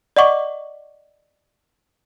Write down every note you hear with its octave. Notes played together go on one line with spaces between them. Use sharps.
D5 D#5 F#5 C#6 D6